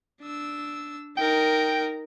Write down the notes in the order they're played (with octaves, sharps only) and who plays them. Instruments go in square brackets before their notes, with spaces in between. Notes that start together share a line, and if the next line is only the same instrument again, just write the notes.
[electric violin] D4 E6
[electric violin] D#4 A#4 [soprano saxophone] G5